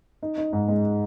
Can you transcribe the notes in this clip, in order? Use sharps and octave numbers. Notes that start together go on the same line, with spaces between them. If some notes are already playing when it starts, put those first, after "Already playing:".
D#4
D#4
G#2
G#3